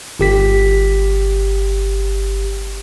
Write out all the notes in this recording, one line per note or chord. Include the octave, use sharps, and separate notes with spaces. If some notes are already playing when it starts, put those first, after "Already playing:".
G1 G4 B6